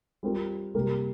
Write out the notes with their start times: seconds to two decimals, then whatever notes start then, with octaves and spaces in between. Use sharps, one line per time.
0.23 G3 C4 F4 A#4
0.74 C3 G3 A#3 G4 A#4